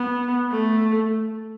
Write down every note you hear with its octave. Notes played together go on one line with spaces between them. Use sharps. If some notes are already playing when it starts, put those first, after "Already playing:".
Already playing: B3
A3